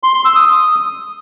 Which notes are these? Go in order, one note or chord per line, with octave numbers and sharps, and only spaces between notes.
C6
C6
E6
D#6